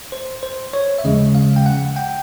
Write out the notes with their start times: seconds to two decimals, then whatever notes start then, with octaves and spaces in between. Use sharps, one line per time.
0.12 C5
0.43 C5
0.73 C#5
0.99 E5
1.04 D#2 C#3 F3 G#3 D#5
1.35 F5
1.56 G5
1.66 F#5
1.96 G5